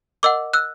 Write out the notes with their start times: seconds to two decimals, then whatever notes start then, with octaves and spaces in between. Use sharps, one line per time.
0.23 A#4 D#5 F#5 D6 E6
0.53 E6 F#6